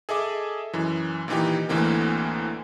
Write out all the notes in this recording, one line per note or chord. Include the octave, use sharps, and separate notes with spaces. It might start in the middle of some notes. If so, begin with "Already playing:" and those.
G#4 A4 D#5 E5 D6
F#2 E3
A#2 D#3 E3 D#4 G4
D2 A2 D3 E3 A#3 C4